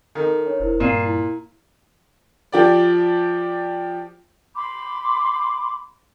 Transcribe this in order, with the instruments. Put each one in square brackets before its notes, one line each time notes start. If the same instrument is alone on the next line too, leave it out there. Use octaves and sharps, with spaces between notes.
[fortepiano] D#3 [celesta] A4 A#4
[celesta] D4 C#5
[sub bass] E1 [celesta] E4 A#4 C5
[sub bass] G2 [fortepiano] A#2 [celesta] C7 D#7 E7
[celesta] E4
[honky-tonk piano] F3 G4 D5
[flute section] B5 C6 D6